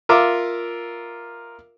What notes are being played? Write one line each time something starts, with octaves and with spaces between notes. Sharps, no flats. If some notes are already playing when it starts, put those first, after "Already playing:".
F4 A#4 E5 D6